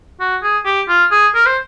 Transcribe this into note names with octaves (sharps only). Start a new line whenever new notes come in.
F#4
G#4
G4
F4
G#4
A#4
C5